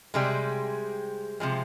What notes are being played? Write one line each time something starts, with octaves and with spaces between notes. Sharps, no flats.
C3 G3 G#3 G#4
C3 F3 G#3